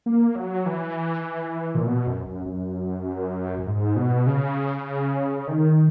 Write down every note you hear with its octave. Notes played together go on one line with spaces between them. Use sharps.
A#3
F#3
E3
A#2
B2
F#2
F#2
F#2
F#2
G#2
B2
C#3
D#3